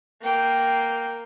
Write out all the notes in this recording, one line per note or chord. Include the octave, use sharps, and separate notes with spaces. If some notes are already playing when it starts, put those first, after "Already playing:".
A#3 G5